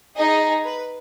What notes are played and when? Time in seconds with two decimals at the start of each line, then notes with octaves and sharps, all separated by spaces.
0.16 D#4 G#4 D#5
0.65 B4